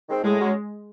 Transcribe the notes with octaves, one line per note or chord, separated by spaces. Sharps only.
D#3 G#3 C4
A2 G#3
F#3 C#4